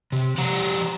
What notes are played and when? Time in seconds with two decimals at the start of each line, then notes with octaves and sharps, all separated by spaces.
0.12 C3
0.38 F3 G4 F#5 A#5